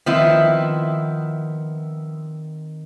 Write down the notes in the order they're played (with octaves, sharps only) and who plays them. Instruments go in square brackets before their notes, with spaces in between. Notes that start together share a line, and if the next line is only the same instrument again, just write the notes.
[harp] D#3 C4 [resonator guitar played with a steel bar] F3 B3 E4